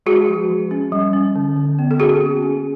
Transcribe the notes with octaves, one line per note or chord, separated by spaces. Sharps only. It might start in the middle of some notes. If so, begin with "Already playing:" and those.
G#3 F#4 G#4
F3
F3
C#4
G3
C#4
D3
D3
B3
A4
C#4 F#4 G#4
A#3
C#4